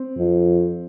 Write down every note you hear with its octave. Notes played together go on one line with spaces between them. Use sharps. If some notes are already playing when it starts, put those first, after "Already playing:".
Already playing: C4
F2